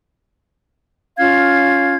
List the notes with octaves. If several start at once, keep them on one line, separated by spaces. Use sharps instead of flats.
C#4 F4 F5 G#6